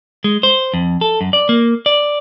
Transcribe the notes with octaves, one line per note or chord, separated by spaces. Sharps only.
G#3
C5
F2
A4
F#2
D5
A#3
D5